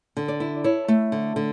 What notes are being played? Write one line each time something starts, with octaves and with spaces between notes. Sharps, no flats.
D3
D5
E4
E4 C#5
A3
D3
D3